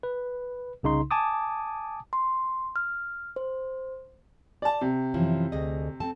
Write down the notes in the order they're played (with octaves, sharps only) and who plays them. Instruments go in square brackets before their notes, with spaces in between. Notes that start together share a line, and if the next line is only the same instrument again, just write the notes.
[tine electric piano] B4
C2 C#3 D#4 C6
G#5 A5 D6 D#6
[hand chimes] C6
F6
C5
[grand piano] D5 A5
C3
[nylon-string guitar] F#2 E3 F3
D2 G#4 D#5
C4 A4 A5